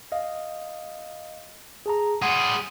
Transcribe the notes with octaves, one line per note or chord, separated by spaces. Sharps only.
D#5 F5
G#4 A5 A#5
G3 G#4 F#5 C6